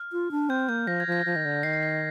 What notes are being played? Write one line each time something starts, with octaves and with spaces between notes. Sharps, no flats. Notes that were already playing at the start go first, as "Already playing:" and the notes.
Already playing: F6
F4
D4
C4 G6
A#3 G6
F3 A#6
G#6
F3 A#6
F3
D#3
D3
D#3 C7
C7
A#6